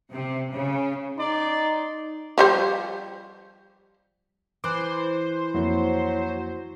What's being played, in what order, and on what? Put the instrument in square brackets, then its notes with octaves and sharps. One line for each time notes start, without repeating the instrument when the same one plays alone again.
[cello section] C3
C#3
[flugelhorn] D#4 [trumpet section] D5 C6
[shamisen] F3 G3 C5
[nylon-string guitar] E3 [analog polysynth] C5 [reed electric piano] D6 F#6
[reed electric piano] F2 A#3 E4 [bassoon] F#3